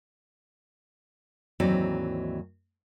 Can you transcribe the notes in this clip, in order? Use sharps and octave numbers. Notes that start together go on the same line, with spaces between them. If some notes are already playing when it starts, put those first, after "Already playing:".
D#2 G#2 E3 F#3 C4 D5